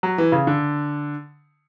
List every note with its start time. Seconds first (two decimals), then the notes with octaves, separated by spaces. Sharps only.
0.03 F#3
0.18 E3
0.32 C#3
0.47 D3